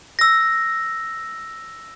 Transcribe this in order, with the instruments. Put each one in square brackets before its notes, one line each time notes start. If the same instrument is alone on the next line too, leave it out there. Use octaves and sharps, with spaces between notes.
[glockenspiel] E6 A#6